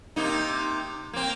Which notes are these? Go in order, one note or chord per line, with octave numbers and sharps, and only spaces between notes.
C3 A#3 D#4
A#3 C4